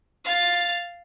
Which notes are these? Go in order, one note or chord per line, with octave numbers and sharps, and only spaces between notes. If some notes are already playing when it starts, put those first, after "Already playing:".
F5 A6